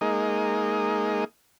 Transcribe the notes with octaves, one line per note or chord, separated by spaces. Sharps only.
G#3 A#3 D#4